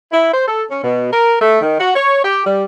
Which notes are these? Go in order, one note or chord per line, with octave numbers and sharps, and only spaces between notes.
E4
C5
A4
C#4
B2
A#4
A3
D#3
F#4
C#5
G4
G3